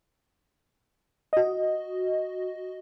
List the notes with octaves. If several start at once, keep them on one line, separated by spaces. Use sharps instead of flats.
F#4 D#5